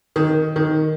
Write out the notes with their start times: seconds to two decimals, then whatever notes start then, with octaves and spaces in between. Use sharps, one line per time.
0.16 D#3
0.56 D#3